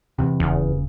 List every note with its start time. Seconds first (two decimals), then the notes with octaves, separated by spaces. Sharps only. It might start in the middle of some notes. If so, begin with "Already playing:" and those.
0.19 E2 C3
0.40 D#1 E2 C#3